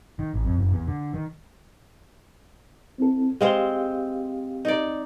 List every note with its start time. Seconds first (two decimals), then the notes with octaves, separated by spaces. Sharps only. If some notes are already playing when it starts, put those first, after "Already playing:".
0.19 D#3
0.34 A1
0.45 F2
0.59 F#1
0.73 E2
0.88 D3
1.14 D#3
2.98 C4 E4 A4
3.41 G#3 C4 G4 C5 F5
4.65 D#4 D5